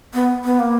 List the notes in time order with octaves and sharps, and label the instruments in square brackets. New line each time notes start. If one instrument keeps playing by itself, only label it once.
[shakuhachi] B3
B3
A#3